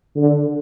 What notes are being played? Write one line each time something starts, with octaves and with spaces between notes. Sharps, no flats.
D3